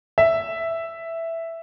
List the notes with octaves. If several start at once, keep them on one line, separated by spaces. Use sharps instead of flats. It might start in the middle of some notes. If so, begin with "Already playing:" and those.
E5